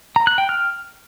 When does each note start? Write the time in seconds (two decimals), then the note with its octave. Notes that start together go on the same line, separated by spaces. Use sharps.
0.16 A#5
0.27 F#6
0.38 G5
0.49 F6